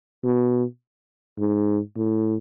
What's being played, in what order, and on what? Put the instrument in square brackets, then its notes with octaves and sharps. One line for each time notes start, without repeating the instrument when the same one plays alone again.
[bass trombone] B2
G#2
A2